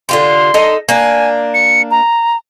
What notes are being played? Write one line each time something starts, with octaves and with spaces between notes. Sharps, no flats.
D3 F4 G4 C6
D#4 A4 D#5
A#3 D4 G#5
C#7
A#5